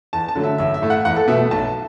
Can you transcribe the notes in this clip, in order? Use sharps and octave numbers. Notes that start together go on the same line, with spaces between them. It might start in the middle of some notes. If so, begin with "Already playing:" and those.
E2 A5
A5
D3 F#3 A3
E5
A1 E5
E5
A2 A3
F#5
E2 F#5
A4
B2 A3 E5
B1 A5